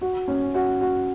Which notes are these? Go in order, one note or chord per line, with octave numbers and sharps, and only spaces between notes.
F#4
C#4
F#4
F#4